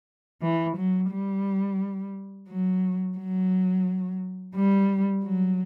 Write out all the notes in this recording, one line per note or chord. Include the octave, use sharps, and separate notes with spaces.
E3
F#3
G3
F#3
F#3
G3
F#3